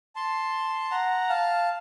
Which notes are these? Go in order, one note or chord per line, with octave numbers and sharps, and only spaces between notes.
A5 C6
F#5 A#5
F5 A5